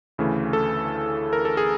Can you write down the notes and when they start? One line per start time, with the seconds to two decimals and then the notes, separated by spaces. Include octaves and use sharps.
0.18 D2 C#3 E3 A3
0.53 A4
1.33 A#4
1.45 A4
1.57 G#4